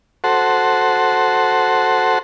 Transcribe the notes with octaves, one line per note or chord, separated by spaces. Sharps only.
F#4 A4 C5